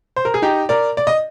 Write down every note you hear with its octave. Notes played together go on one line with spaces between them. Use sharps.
C5
A#4
G#4
D#4 G4
A#4 D5
D5
D#5